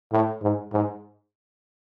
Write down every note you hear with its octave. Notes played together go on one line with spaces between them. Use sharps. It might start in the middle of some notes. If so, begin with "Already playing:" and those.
A2
G#2
G#2